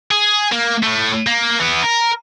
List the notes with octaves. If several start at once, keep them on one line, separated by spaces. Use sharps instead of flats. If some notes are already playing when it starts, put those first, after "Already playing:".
G#4
A#3
A2 A3
A#3
E3 B3
A#4